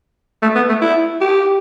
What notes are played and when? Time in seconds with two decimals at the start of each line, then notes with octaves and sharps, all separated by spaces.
0.42 A3
0.56 B3
0.69 A3
0.82 E4
1.21 G4